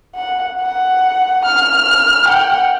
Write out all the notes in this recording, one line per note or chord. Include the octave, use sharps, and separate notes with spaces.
F#5
F#5
F6
F#5 G5